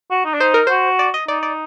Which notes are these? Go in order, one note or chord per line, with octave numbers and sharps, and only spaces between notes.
F#4
D#4
D4
D#4 C5
A#4
F#4 C5
D5
D#5
D#4 D5
D5